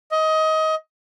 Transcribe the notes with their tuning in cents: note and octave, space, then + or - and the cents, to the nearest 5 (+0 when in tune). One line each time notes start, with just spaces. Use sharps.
D#5 +20